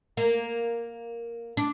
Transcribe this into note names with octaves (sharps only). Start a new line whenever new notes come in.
A#3
D4